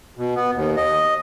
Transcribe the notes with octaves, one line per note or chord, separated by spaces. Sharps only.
B2
B3
D#2
D#5